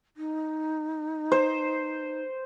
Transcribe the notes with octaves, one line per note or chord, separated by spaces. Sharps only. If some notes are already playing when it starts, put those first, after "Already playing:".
D#4
C5